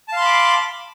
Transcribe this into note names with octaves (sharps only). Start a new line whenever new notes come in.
F5 A5 B5 C6 D6